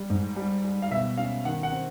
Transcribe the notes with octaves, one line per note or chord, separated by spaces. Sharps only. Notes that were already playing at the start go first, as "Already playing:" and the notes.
Already playing: G3
G#2
G3
G3
F5
B2 E5
C#4 F5
D#3 F#5
F#5
C4